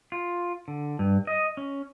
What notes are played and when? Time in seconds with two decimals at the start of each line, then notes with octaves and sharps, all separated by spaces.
0.12 F4
0.68 D3
0.99 G2
1.27 D#5
1.57 C#4